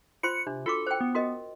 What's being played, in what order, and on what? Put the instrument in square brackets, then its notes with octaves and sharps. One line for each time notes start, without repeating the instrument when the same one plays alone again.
[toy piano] F4 C5 C6 [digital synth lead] C#7
[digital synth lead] C3 [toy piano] D4
[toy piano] F4 F#4 D6 [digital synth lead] A4
[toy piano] C5 G5
[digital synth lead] B3
[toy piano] F#4 A#4 D#5